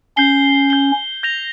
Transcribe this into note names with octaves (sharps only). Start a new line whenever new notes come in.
C#4 G6 C7 G7
G6 C7 G7
G6 A#6 F7